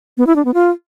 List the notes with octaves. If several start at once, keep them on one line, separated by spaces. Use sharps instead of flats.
B3
E4
D4
B3
F4